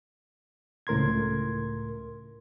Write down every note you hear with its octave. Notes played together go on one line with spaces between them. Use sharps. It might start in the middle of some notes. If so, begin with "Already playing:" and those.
C#2 A2 A#4 C6 G#6